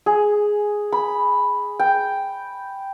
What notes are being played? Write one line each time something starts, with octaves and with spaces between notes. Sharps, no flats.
G#4
B5
G5